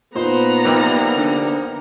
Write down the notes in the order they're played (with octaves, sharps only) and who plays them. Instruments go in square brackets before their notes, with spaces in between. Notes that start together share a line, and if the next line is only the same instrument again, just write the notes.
[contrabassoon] A#2 [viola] B3 A#5 [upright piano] D#4 [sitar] C5
[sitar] F2 C3 G3 [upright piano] A#3 D#4
[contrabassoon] D3